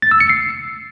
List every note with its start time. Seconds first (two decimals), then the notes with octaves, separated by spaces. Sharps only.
0.02 A6
0.11 E6
0.20 C#7
0.29 C7